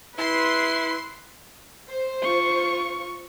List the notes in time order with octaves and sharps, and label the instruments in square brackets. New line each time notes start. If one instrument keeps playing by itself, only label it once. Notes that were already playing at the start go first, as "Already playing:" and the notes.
[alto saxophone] E4 [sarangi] B4 [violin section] C6 C7
[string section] C5
[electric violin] F4 C#6